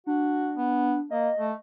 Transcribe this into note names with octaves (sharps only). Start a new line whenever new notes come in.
D4 F#4
B3
A#3 D#5
A3